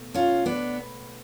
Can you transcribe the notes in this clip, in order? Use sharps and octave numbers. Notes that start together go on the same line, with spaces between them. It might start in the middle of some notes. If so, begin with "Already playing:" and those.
Already playing: B2 A3
C#4 F4
B3 D4